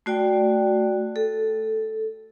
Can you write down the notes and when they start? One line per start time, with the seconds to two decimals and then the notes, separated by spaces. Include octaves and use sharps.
0.06 A3 F#4 D5 G5
1.16 A4